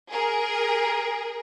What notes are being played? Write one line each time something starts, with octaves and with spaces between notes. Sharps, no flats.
G#4 A#4